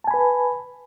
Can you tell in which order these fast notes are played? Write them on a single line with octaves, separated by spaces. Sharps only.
A5 G#5 B5 B4